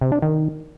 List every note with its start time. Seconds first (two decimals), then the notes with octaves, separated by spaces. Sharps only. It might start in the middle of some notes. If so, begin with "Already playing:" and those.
0.01 C3
0.12 D4
0.22 D#3